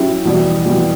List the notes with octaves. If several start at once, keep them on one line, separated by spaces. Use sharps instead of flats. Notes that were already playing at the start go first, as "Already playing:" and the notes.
Already playing: F#3 C#4 E4 G4
E2 B2 G3
E2 B2 G3